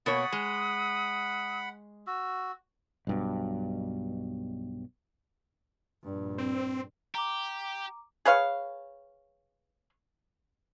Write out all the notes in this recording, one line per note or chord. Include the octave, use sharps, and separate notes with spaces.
B2 A#3 C#5 F#5 B5 D#6
G#3
F#4 E6
B1 G2 B2
A#1 G2
C4
G4 A#5 D6
G#4 B4 C#5 F5